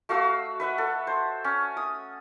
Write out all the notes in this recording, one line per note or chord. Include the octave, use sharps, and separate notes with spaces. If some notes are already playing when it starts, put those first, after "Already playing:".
A3 F#4 F5 E6
B4 E5 F#5
A4
C5
C#4
D#6